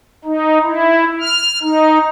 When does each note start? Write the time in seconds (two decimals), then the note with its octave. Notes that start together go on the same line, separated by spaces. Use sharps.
0.25 D#4
0.64 E4
1.21 F6
1.63 D#4